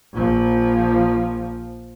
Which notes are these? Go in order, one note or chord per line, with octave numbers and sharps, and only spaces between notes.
A#1 F3